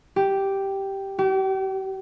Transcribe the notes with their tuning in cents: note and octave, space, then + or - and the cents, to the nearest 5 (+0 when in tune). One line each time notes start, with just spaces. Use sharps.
G4 -5
G4 -40